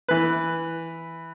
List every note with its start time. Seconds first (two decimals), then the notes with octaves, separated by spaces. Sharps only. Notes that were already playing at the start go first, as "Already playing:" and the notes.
0.08 E3 B4